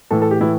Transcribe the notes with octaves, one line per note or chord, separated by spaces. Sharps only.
A2 E3 A4
A4
G4
A2 E3 E4